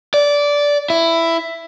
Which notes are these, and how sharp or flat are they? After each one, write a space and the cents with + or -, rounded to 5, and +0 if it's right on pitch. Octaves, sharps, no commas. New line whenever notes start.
D5 -15
E4 +10